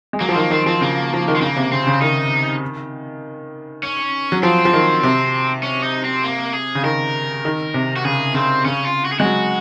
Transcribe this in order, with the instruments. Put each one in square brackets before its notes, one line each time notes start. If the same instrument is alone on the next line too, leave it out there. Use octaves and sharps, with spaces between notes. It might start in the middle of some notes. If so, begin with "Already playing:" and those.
[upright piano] G#3
[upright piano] F#3 [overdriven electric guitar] A#3
[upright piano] F3 [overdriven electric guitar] C4
[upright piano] D#3 [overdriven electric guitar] A#3
[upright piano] D#3 [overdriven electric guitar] C4
[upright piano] F3 [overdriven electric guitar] C4
[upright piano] C#3 [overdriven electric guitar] A#3
[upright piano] F3
D#3
[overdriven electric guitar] G#3
[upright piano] C#3 [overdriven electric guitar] A#3
[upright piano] C3
[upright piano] C#3 [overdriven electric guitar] C4
[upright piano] C#3
[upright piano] D#3 [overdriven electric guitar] D#4
[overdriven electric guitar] C#4
[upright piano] F#3
[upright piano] F3 [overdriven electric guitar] C4
[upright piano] F3
D#3
C3
[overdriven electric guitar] C#4
D#4
C4
A#3
G#4
[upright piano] C#3
[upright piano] D#3 [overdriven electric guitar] A#4
[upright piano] D#3
C3
[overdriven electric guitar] F#4
[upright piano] C#3 [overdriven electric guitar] G#4
[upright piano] C#3 [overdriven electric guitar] C4
[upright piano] C#3 [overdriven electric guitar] C#4
[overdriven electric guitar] F4
F#4
G#4
[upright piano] G#3 [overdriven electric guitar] F#4
[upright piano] F#3